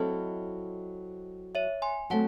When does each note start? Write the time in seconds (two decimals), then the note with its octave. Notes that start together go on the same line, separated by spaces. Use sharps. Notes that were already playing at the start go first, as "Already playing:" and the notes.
Already playing: F#3 C4 E4 A4 C5 D#5
1.55 C#5 E5
1.82 G#5 C6
2.10 F#3 A3 C4 F#5 A5